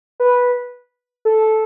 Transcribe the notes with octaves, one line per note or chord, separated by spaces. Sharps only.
B4
A4